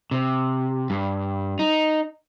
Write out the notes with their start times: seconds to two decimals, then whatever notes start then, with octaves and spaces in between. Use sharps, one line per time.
0.11 C3
0.90 G2
1.59 D#4